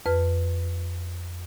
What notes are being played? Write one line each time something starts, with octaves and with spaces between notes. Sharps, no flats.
F2 B4 F6